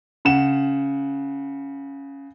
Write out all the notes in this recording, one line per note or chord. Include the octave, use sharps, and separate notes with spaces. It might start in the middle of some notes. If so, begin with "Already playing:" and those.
C#3 F#5 E7